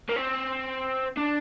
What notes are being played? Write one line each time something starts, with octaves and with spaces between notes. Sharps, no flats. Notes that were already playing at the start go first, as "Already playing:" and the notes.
A#3
C4
D4